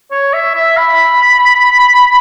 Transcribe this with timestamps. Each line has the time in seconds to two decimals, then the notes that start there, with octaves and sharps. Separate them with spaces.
0.11 C#5
0.33 E5
0.55 E5
0.77 B5